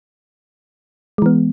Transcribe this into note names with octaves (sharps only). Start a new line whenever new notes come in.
E3 G#3 B3